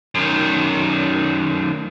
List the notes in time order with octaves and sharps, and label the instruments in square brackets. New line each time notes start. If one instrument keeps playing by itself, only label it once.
[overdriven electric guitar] F#2 D#3